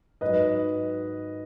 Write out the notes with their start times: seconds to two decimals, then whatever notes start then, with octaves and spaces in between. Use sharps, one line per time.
0.21 G#2 F#3 B4 D#5